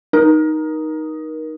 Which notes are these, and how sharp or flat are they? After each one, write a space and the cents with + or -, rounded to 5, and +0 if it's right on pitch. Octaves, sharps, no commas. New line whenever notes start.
D#4 +0 A#4 +30